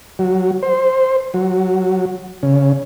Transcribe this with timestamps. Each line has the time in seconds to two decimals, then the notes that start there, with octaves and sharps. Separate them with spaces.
0.19 F#3
0.63 C5
1.34 F#3
2.43 C#3